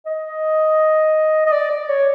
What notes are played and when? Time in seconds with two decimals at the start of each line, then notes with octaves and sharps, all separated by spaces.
0.06 D#5
1.46 D#5
1.52 D5
1.71 D5
1.89 C#5